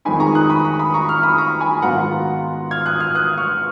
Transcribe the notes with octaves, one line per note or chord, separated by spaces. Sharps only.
F2 D#3 G#3 D#4 G#5 B5
A#5 C#6
D#6 F#6
B5 D#6
A#5 C#6
B5 D#6
A#5 C#6
C#6 F6
B5 D#6
A#5 C#6
G#5 B5
G#2 D#3 F#3 B3 F4 F#5 A#5
F6 G#6
D#6 F#6
F6 G#6
D#6 F#6
C#6 F6